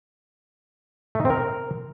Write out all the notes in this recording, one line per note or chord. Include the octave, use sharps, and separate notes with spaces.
A3
D#4
C4
A#4